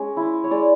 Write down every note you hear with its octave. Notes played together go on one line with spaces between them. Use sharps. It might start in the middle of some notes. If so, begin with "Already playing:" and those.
Already playing: G#3 C#4
E4
C#5
G#3 D5